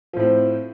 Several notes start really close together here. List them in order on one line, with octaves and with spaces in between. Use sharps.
F3 A2 C4